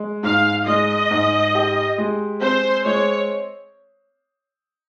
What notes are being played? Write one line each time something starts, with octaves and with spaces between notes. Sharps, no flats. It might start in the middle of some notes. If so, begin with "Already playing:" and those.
Already playing: G#3
G#2 F5
G#3 D#5
G#2
G4
G#3
C4 C5
G#3 C#5